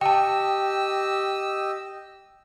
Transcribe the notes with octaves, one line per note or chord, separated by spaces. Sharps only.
G4 D#5 G5 A5 E6